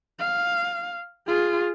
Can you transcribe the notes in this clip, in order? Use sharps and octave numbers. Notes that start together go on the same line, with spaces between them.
F5
F4 G#4